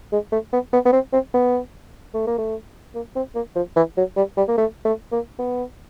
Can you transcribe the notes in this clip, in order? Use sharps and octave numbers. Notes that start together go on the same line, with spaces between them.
G#3
A3
B3
B3
B3
C4
C4
B3
A3
A#3
A3
A#3
C4
A#3
F3
E3
F#3
G3
G3
A#3
A3
A3
A#3
B3